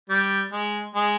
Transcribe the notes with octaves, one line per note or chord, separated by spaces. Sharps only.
G3
G#3
G#3